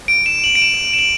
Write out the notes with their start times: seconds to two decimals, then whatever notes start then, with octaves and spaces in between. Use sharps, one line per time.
0.08 D7
0.26 E7
0.44 F#7
0.55 D7
0.62 E7
0.93 E7
0.99 F#7